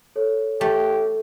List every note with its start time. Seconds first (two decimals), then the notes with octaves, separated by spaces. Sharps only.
0.16 A4 C#5
0.61 A3 G4